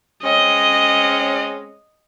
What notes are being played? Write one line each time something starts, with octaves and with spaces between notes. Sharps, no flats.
G#3 C4 C#4 D#5